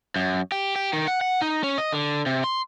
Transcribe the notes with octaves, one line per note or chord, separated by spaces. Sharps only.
F#2
G4
G4
D#3
F#5
F#5
D#4
C#4
D#5
D3
C3
C6